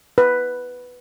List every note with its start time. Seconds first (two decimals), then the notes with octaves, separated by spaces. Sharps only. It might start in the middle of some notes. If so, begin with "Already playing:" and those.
0.18 B4